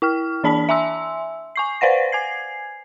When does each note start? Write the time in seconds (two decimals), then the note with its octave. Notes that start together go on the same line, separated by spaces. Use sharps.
0.02 E4 G5 F6
0.44 E3 D4 D5 A5 B5 B6
0.69 E5 G#5 C6 E6
1.56 G#5 C#6 C7
1.81 B4 C5 D5 F5 F#5 A#6
2.12 G#5 G#6 C7